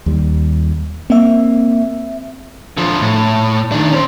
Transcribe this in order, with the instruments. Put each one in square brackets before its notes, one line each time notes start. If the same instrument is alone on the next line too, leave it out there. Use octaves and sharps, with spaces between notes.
[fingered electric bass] D#2 G3
[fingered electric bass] A#3 [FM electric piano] C4 E5
[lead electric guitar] D3 F3
A2
D#3 D4
C#4 C5